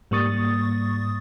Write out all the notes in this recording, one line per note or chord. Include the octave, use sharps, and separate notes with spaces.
G#2 G3 A#3 C#6 D#6 A6